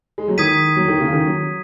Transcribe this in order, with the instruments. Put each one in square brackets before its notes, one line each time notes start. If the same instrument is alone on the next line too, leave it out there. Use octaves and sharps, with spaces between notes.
[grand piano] G#3
F#3
[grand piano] D#3 [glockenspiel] D#6 G#6 B6 D#7
[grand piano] F#3
D#3
C#3
D#3
F#3